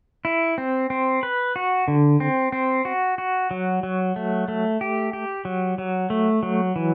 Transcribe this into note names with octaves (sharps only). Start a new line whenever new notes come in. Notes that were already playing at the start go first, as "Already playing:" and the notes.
E4
C4
C4
B4
F#4
D3
C4
C4
F#4
F#4
F#3
F#3
A3
A3
G4
G4
F#3
F#3
A3
F#3
E3